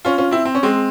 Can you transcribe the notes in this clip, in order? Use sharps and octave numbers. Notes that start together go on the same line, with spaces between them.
C#4 F4
C#4 F4
C4 E4
C4
C#4
G#3 C4